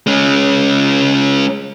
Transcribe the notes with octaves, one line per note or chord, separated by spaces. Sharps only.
G#3 C#4